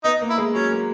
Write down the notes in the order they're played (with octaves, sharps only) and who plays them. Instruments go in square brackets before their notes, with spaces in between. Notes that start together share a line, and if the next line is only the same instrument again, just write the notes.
[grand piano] B3 [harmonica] D#4
[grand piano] A#3
[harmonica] E4
[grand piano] G#3
[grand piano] F#3 [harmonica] C#4
[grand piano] A#3